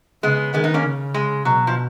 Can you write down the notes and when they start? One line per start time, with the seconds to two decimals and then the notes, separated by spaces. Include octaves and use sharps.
0.23 C#3 G#3 B3
0.54 D#3 G#3 B3
0.64 B3 D#4
0.74 A#3 C#4
0.84 C#3
1.14 G#3
1.45 B2 F#3
1.67 F3